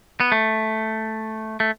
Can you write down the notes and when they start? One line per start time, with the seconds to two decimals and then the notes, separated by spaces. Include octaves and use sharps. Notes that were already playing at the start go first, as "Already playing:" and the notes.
0.20 B3
0.32 A3
1.60 A3